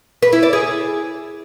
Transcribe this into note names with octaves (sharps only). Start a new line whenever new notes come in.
B4
E4
D5
G#4